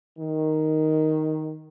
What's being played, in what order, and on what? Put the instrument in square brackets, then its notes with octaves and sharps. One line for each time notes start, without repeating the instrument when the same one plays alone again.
[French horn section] D#3